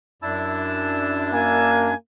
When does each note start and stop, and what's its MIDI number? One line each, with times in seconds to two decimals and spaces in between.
0.22 1.94 42
0.22 1.94 62
0.22 1.70 64
0.22 1.70 81
0.22 1.70 88
1.32 1.95 58
1.32 1.95 80